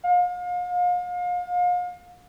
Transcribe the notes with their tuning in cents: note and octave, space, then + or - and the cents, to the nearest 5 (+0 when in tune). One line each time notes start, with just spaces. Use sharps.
F5 +35